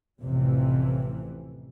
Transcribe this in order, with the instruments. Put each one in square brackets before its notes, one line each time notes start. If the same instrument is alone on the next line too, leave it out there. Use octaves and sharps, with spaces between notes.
[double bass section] A1 F2 C3 E3